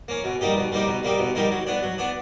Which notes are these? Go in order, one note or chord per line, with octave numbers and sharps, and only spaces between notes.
A#3 C#4
B2
G3 A#3 D#4 G4
B2
G3 A#3 D#4 G4
B2
G3 A#3 D#4 G4
B2
G3 A#3 D#4 G4
F#3
B3 D4
F#3
B3 D4